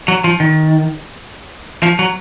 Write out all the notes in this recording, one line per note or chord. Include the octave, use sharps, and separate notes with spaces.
F#3
F3
D#3
F3
F#3